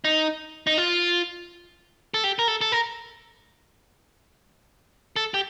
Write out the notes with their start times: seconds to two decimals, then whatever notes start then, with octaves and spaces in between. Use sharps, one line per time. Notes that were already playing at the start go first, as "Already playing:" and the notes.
0.04 D#4
0.67 D#4
0.78 F4
2.14 A4
2.24 G4
2.39 A#4
2.48 A4
2.61 A4
2.72 A#4
5.16 A4
5.34 G4